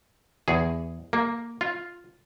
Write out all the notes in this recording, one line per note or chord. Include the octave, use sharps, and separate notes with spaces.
E2 G#4
A#3
F4